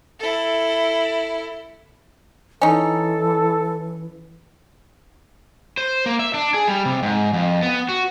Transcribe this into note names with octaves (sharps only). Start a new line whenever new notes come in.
E4 A4
E3 C#4 D#4 A4
C5
A#3
E5
D4
G#4
G3
C3
G#2
F2
B3
F#4